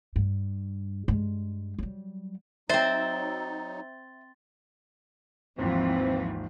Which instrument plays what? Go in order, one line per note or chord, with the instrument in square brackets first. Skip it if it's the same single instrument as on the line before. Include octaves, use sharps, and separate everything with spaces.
[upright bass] G2
G2 G#3
F#3 G3
[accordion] F#3 D#4 [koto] C4 C5 [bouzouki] E5 [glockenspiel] A6 G7
[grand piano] G#1 D#2 [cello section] E3 F3 [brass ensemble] C4